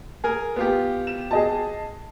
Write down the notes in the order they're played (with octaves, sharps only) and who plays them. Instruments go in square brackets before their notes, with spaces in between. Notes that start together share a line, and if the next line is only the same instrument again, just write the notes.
[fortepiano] G#4 A#4 G#5
B3 F4 G4
[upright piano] E7
G#4 D#5 A5